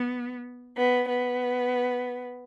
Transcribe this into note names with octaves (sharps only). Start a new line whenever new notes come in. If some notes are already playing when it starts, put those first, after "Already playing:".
Already playing: B3
B3
B3